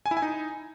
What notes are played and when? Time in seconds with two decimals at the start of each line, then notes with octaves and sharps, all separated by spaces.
0.06 G#5
0.11 E4
0.17 G#5
0.22 D#4